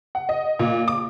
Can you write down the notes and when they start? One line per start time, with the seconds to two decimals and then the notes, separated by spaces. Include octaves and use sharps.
0.15 F#5
0.29 D#5
0.59 A#2
0.88 D6